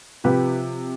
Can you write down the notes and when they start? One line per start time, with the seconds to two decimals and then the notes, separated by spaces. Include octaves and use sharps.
0.24 C3 F3 G4 B4